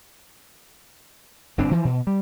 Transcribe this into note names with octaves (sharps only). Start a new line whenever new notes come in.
G1 A2 C4 D4
E3 F3
B2
G3